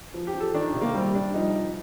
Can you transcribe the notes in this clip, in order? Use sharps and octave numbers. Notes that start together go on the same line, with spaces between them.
F3
G4
F3
A4
D#3 D4
C3
A#3
G3 C4
G3 D4
F3 D#4
F3